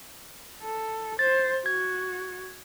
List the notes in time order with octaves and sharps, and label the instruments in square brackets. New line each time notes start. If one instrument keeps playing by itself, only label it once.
[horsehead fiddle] A4
[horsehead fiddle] C5 [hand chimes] A6
[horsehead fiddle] F#4 [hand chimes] G#6